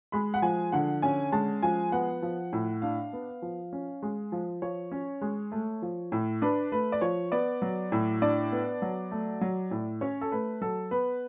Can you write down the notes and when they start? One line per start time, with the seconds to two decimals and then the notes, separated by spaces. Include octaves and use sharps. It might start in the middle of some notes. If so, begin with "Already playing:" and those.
0.12 G#3 B5
0.34 F#5
0.42 F3 G#5
0.72 D3 F#5
1.02 C#4 G#5
1.32 G#3 A5
1.63 F3 G#5
1.92 B3 F#5
2.22 F3
2.53 A2
2.82 D4 F5
3.13 B3
3.42 F3
3.73 C#4
4.03 G#3
4.32 F3
4.62 F3 C#5
4.92 C#4
5.22 G#3
5.52 A3
5.82 F3
6.12 A2
6.42 D4 B4
6.72 A3 B4
6.92 D5
7.01 F3 C#5
7.32 B3 D5
7.62 F#3
7.92 A2
8.22 D4 D5
8.52 B3
8.82 F#3
9.11 A3
9.41 F#3
9.71 A2
10.01 C#4 C#5
10.21 A4
10.32 A3 B4
10.61 F#3 A4
10.91 B3 B4